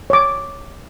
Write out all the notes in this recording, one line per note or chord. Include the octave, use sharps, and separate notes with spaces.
C#5 D6